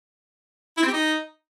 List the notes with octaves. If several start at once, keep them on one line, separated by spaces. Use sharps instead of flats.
E4
C4
G4
D#4